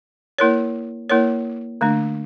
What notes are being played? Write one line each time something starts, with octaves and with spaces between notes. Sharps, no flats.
A#3 E4 A#4 C#5
A#3 E4 A#4 C#5
D3 A3 D4